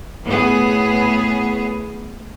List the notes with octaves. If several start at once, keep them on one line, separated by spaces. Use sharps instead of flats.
A2 B3 G#4